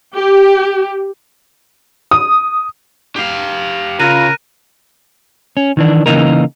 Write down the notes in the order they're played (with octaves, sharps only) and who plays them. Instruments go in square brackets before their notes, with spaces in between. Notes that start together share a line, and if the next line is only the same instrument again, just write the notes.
[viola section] G4
[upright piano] D#6
[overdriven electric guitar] G4 F5
[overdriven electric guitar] C#3 [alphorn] F4 [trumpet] A#4 [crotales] F#6 A#6 D#7
[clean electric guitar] C#4
D#3 E3 D4
C#3 E3 A#3 D#4 A#4